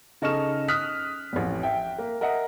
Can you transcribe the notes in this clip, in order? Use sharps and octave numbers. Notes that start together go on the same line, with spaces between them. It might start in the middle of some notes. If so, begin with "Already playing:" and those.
C#3 D#4 A4 C#6 F6 E7
D#6 F6 F#6 B6
A1 F2
E5 G5
A#3
A#4 D#5 E5 F#5